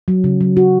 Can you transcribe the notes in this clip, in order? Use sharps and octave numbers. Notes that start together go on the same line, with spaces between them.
F#3
C#3
F#3
F#4